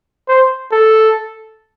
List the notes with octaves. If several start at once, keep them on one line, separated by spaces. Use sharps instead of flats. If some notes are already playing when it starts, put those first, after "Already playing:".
C5
A4